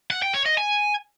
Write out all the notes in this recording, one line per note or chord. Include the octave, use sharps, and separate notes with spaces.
F#5
G5
C#5
D#5
G#5